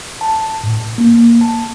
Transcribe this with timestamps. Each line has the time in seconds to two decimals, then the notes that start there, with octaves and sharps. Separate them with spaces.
0.21 A5
0.63 A2
0.98 A#3
1.41 A5